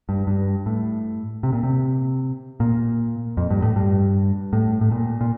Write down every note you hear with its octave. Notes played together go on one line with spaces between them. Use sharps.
G2
G2
A2
C3
A#2
C3
A#2
F2
G2
A2
G2
A2
A2
A#2
A#2